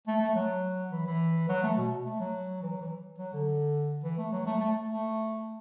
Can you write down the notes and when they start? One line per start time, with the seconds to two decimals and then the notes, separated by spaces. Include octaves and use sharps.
0.08 A3
0.21 A3
0.35 F#3
0.92 E3
1.07 E3
1.49 F#3
1.63 A3
1.77 B2
2.06 A3
2.20 F#3
2.62 E3
2.72 F#3
2.81 E3
3.18 F#3
3.33 D3
4.03 E3
4.18 A3
4.32 F#3
4.46 A3
4.60 A3
4.89 A3